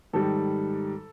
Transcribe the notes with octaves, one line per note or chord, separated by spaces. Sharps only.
G#2 D#3 G3 A4